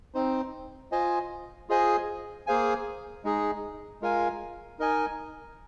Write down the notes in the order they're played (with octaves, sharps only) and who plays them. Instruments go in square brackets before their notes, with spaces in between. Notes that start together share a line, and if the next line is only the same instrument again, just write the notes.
[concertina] C4 D#4 C5
F4 C5 D#5 G#5
F4 G#4 C5 D#5 G#5
A#3 G#4 C5 F5 G#5
G#3 D#4 G#4
G#3 F4 A#4 F5 G#5
D#4 A#4 D#5 G#5